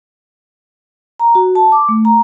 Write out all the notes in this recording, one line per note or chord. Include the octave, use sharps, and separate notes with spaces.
A#5
F#4
A5
D6
A3
A#5